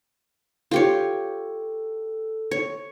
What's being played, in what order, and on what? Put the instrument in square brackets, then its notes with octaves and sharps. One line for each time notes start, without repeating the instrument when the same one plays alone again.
[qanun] F4 G4 C#5 [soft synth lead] A4
[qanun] C#5